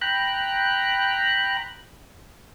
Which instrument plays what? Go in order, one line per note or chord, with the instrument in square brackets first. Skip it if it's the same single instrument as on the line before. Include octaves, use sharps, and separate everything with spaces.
[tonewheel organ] G5 A#5 B5 F#6